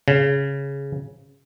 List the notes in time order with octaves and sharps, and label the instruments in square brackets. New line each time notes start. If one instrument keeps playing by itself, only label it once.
[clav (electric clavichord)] C#3